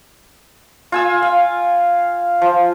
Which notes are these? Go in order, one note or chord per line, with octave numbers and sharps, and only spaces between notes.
F4 G#5 E6
F5
F3